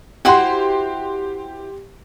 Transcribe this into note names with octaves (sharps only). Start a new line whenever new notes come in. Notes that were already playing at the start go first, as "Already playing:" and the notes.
E4 F#4 G4 C5 C6